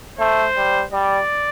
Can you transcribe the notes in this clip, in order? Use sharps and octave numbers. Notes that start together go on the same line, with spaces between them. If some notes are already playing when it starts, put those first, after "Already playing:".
A3 C5
G3
G3 D5